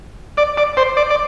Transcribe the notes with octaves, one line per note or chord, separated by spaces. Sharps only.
D5
D5
C5
D5
D5